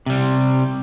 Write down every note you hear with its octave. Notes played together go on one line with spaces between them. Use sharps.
C3 G3